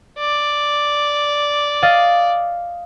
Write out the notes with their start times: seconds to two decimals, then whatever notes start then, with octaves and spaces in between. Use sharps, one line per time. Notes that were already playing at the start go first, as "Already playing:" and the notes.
0.19 D5
1.82 D#5 F5 A6